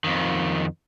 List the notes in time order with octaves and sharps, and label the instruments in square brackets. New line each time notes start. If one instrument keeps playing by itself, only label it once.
[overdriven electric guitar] F2 D#3